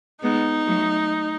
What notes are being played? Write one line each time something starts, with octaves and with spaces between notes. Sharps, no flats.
G#3 B3 D#4
F#3 A3